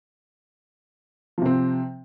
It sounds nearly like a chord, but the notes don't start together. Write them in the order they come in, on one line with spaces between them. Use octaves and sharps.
F3 C3 C4